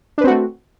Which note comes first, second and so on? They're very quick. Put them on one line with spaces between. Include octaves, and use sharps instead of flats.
D4 B4 C4 F#4 A3